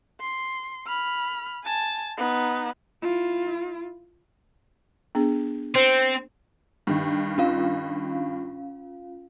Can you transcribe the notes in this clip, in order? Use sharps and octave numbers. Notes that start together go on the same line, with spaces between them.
C6
B5 F6
G#5 A5
B3 D#4
E4 F4
B3 D4 G#4
C4 C5 C#7
G2 D#3
C#4 F4 F5